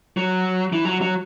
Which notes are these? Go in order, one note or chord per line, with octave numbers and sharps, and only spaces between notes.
F#3
E3
F#3
F#3